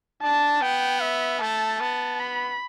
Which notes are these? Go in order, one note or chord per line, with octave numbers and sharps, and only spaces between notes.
D4 A5
B3 G5
E5
A3 A5
B3 A5
B5